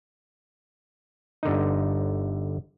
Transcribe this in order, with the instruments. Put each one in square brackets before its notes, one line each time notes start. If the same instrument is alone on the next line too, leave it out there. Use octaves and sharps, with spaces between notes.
[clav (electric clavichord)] G1 D3 D#4